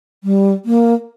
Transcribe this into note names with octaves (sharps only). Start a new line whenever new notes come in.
G3
A#3